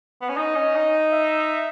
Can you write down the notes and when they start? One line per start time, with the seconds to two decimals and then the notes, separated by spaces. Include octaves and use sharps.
0.21 B3
0.29 C#4
0.37 D#4 D#5
0.56 C#4
0.75 D#4
1.13 E5